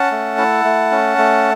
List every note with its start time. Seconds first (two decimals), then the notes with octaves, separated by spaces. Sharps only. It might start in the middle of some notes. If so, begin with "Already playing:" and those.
Already playing: C#4 F#5 A5
0.11 A3
0.38 E4
0.65 A3
0.91 C#4
1.18 A3